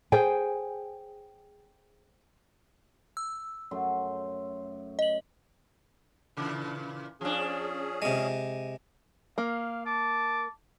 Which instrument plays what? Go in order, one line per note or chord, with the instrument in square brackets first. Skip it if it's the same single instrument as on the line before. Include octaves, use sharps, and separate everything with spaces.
[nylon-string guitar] G#4 C5 G5 G#5
[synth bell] E6
[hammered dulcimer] F#2 A3 C6
[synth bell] D#5 F#7
[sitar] A#2 C#3 E3
[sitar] F3 D4 [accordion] C#4 G#4
[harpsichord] C3 G#3
[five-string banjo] A#3 [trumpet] F5
[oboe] A5 [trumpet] D6